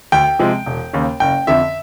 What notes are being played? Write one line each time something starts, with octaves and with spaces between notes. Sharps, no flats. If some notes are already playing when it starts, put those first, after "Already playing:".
D2 G5
C3 F3 G#3
E1
D#2 C#3
F#1 G5
F2 D3 E5